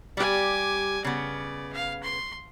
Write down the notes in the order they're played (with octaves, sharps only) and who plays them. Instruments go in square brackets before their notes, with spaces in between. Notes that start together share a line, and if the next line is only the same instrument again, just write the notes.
[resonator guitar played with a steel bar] G3 G4 [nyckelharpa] G#5 D6
[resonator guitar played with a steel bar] C#3 B3 [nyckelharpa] D5
[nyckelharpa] F5
C6